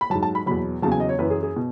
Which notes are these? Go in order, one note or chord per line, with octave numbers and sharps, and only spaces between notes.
B5
G#2 F#3 A5
A5
B5
E2 B2 F#3 B5
E2 C#3 F#3 A5
G#5
D#5
C#5
F#2 E3 B4
G#4
G#4
B2